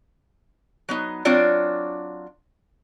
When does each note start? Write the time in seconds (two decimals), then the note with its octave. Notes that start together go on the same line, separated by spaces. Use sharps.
0.89 F#3 B3 D#4
1.25 F#3 C4 D4 F4 C#5 D5